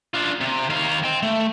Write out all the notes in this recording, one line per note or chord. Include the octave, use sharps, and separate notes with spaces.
D4 F4
C3
D#3 F5
G5 C6
A3